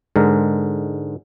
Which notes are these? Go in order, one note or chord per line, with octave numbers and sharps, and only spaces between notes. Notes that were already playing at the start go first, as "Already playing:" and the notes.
G#2 D3 G#3 A#4